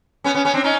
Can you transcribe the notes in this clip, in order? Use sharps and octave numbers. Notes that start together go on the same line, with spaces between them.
B3 C#4
B3 C#4
B3 C#4
C4 D4
C#4 D#4